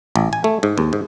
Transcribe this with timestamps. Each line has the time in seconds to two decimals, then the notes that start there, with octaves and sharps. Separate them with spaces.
0.16 A1
0.33 G#5
0.44 A3
0.63 G#2
0.78 D#2
0.93 G#2